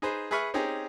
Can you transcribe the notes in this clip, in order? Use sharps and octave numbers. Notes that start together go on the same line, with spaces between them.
D#4 G#4 B4 C5
G#4 B4 E5 B5 C#6 F6
C4 C#4 D#4 G4 G#4